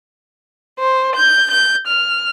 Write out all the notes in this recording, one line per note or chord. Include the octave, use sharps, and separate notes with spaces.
C5
G6
G6
F6